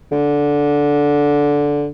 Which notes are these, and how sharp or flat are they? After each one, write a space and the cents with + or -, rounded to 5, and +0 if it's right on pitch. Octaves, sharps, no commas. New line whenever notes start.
D3 -10